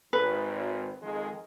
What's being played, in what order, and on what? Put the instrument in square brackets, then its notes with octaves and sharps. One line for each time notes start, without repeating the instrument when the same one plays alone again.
[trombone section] G#1 [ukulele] B4
[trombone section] F2 D#3 G#3